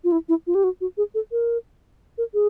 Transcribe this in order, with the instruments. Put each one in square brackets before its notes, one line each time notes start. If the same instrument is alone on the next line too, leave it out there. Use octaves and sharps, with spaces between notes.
[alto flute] F4
E4
E4
F4
G4
F#4
F#4
G#4
A4
A#4
A#4
G#4